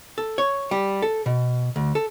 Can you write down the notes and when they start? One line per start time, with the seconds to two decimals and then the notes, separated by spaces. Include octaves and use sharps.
0.18 A4
0.38 C#5
0.71 G3
1.02 A4
1.26 B2
1.76 D2
1.95 A4